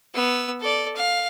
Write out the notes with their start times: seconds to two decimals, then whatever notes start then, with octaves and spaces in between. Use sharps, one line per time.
0.14 B3 E6
0.60 A4 D5
0.96 F5